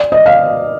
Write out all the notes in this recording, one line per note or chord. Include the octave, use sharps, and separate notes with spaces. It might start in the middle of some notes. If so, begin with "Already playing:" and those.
Already playing: D5
D#5
F5